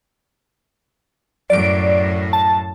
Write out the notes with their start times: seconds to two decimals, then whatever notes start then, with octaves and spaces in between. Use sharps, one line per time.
1.50 F#2 A2 D5 D7
2.33 A5